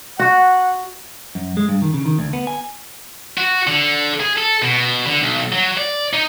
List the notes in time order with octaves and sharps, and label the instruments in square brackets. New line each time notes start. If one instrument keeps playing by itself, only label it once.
[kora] F#4 [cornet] F#5
[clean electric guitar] F#2
G#3
G2
D#3
C#3
D#3
D2
B3
G#5
[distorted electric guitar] F#4
D3
G#4
A4
B2
D3
B1
F#3
D5
D#4